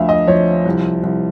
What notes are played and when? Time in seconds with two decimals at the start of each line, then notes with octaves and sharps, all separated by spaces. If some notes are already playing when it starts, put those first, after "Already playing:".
Already playing: D2 D3 F3 E5 F5
0.09 D#5
0.27 F3 C#5
0.65 C2
1.03 C2